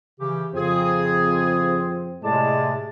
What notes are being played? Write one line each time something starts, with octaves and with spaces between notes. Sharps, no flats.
C#3 E3 G4
F2 C#3 C4 G#4
A2 C3 G#3 D5 A5